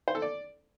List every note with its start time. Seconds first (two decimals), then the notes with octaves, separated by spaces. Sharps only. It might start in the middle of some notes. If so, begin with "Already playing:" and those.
0.08 C5
0.15 A4
0.22 D5